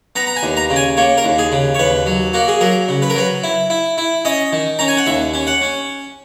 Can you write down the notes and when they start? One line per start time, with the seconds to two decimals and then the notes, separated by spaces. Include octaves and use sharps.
0.16 B3 A#5
0.27 A#5
0.36 G#5
0.43 D#2
0.57 A#5
0.70 C#3
0.76 G#5
0.97 A#3 C#5
1.18 A#4
1.24 D#2
1.38 G#4
1.52 C#3
1.75 C#5
1.79 D#2 B4
2.06 F#3
2.33 A#3 F#4
2.48 G#4
2.61 F#3 A#4
2.88 C#3
3.02 B4
3.10 A#4
3.15 F#3 B4
3.43 E4
3.70 E4
3.98 E4
4.25 C#4 D#5
4.53 D#3
4.79 C#4 A#5
4.88 G#5
4.97 F#5
5.06 D#2 E5
5.34 C#4
5.47 F#5
5.62 C#4